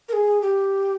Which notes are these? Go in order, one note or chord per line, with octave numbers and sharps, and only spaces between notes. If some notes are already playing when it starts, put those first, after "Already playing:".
A#4
G#4
G4